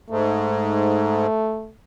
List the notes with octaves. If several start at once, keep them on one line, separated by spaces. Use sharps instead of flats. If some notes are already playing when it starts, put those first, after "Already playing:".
G#2 A3